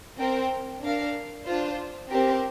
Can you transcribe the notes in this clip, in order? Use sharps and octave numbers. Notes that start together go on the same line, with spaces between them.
C4 A#4 G5
D4 A#4 F5
D4 F4 C5
C4 G4 A#4